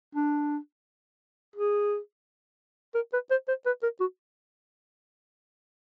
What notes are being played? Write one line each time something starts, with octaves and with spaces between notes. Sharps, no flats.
D4
G#4
A#4
B4
C5
C5
B4
A#4
F#4